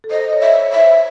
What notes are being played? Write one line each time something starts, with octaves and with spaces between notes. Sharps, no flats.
A4
C5 D#5
C#5
E5
C#5
E5
C5